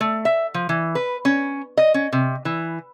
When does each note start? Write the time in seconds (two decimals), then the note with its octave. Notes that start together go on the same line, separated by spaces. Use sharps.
0.01 A3
0.25 E5
0.54 F3
0.69 E3
0.95 B4
1.25 C#4
1.77 D#5
1.94 C#4
2.13 C3
2.45 E3